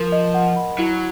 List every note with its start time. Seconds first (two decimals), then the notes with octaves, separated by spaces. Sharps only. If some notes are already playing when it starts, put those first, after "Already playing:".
Already playing: F3 A#4
0.12 D#5
0.34 F#5
0.56 B5
0.78 F#3 E4